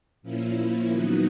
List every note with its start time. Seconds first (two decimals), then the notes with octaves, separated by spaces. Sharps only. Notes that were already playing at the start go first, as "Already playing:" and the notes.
0.22 A#2 F3 A#3 C#4 E4
0.90 D#3 F#3 B3 D#4 F#4